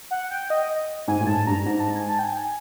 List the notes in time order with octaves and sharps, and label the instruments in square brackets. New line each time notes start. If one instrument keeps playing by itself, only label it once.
[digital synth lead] F#5
G5
D#5
[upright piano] G#2 [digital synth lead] G#5
[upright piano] A2
[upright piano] G#2 [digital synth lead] A5
[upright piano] G2 [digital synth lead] A#5
[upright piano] G#2 [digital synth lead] A#5
[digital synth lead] A#5
A5
G#5
A5
G5
G#5